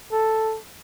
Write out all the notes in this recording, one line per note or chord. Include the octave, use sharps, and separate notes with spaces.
A4